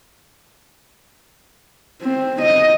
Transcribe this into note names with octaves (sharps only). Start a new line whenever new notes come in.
C4
D#5